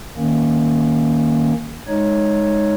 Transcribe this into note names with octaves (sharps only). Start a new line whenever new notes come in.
D#3 A#3 C#4
G#3 D#4 C#5